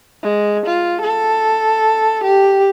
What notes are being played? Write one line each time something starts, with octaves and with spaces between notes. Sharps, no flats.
G#3
F4
A4
G4